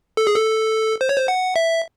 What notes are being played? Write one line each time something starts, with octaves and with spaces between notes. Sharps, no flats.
A4
G#4
A4
C5
C#5
C5
F#5
E5